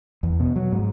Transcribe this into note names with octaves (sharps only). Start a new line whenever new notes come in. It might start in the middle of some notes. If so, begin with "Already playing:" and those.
E2
B2
F#3
G#2